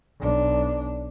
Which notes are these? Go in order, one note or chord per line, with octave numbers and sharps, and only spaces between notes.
B1 D4